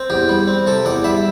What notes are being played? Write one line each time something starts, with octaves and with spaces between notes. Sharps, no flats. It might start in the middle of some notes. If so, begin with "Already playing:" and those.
Already playing: C4
E2 G4
G3
C4
C3 A4
E2 D5
G3 E5